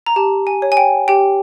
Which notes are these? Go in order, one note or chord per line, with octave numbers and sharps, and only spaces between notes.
A#5
G4 A5
G#5
C#5
G#5
G5
G4 G5